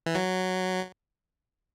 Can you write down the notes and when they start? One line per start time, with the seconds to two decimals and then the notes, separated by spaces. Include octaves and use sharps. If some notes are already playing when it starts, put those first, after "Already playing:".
0.06 E3
0.15 F#3